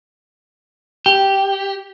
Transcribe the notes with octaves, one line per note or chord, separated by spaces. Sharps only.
G4